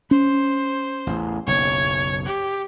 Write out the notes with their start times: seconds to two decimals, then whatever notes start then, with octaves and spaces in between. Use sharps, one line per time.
0.11 C#4 C5
1.07 A1 E2
1.47 F#1 B1 C#5
2.26 G4